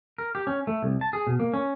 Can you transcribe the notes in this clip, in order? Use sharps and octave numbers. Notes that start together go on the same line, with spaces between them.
A#4
G4
C#4
A3
C2
A5
G#4
B2
A#3
C#4